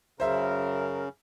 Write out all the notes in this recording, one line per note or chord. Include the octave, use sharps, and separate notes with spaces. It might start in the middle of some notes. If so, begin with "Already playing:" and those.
F#2 C#3 A#4 C5 E5